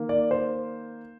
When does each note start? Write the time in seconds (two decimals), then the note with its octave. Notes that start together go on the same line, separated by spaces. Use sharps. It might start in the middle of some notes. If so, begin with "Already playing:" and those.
Already playing: D#3 A#3
0.09 D5
0.31 C5